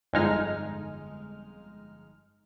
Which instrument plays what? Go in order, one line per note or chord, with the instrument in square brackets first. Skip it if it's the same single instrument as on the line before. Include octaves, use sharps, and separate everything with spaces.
[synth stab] G1 F2 G#3 D#4 F6